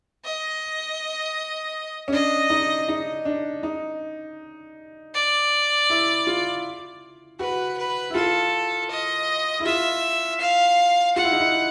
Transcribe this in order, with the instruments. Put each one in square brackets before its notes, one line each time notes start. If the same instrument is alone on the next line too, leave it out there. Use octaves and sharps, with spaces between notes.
[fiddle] D#5
[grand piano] C#4
[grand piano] D4 [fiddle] D#5
[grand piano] D#4
D#4
D4
D#4
[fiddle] D5
[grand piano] E4
F4
[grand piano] F#4 [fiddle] B4
[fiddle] B4
[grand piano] E4
[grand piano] F4 [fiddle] A4
[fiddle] D#5
[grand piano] E4
[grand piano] F4 [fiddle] E5
[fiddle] F5
[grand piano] F4 [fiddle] F#5
[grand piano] E4
D#4
E4